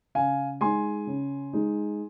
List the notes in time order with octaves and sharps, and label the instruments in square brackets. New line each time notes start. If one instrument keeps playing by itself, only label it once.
[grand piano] C#3 F5 G#5
G#3 D#4 G#5 C6
C#3
G#3 D#4